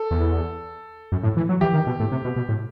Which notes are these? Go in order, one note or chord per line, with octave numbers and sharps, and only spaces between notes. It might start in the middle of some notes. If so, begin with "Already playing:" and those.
Already playing: A4
E2
F#2
A2
E3
F#3
E3 G4
D#3
B2
A2
C3
B2
B2
A2